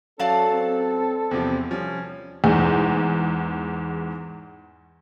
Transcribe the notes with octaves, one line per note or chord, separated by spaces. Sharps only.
F#3 C#4 A4 D5 F5 A5
C4
E2 C3 F3 C4
F3 G3 C#4
E2 G#2